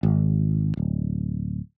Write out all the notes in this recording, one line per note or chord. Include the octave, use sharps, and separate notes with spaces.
G#1
D1